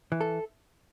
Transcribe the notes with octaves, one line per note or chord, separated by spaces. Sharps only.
E3
A4